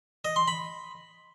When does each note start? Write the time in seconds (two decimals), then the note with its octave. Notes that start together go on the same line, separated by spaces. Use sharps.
0.25 D#5
0.36 C6
0.48 B5